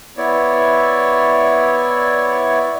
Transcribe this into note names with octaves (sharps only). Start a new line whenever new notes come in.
B3 E4 C#5 D5